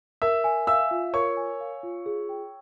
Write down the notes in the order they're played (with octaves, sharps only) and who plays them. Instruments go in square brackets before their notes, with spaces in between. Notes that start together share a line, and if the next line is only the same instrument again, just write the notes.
[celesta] A#4 [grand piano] E5 E6
[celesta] G#5
[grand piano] E5 E6 [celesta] F5
[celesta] F4
[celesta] A#4 [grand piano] C#5 C#6
[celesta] G#5
F5
F4
G#4
G5